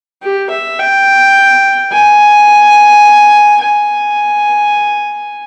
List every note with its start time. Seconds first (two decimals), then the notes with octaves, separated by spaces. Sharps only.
0.22 G4
0.50 E5
0.79 G5
1.92 G#5
3.63 G#5